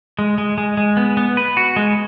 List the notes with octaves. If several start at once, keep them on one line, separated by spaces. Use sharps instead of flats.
G#3
G#3
G#3
G#3
B3
B3
B4
F#4
G#3